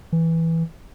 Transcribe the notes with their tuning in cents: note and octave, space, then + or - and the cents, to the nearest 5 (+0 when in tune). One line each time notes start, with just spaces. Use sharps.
E3 -5